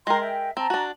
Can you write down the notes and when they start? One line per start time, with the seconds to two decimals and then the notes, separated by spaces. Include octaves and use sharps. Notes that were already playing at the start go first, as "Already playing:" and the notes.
0.07 G#3 A#4 G5 C6
0.21 E5 G5
0.57 C4 A5 A#5
0.70 D4 F#4